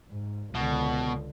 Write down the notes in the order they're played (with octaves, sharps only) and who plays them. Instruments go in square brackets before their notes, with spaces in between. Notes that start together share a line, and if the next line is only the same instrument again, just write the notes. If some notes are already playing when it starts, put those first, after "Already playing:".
[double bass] G#2
[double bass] C#2 D3 [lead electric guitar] B2